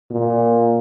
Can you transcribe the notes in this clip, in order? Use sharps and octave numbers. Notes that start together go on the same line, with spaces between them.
A#2